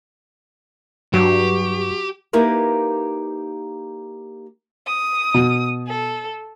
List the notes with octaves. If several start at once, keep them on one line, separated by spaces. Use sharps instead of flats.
G2 F#3 F#4 G4
A#3 D#4 E4 G4 A#4 B4
D#6
B2
A4